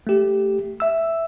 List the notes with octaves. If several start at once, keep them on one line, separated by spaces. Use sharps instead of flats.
A3 G4
E5 E6